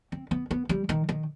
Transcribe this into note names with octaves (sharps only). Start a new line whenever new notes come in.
C4
B3
B3
G3
D#3
D#3